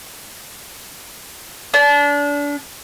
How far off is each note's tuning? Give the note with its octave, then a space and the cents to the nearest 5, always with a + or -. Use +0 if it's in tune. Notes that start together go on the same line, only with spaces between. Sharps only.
D4 -30